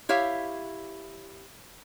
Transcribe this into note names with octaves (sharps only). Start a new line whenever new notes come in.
E4 G4 C#5 E5 F5